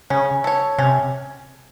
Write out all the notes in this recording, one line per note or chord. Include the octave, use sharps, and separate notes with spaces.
C#3 C#4
A4 C#5
C3 C#4